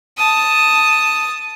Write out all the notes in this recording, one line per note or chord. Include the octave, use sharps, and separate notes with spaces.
A5 D#6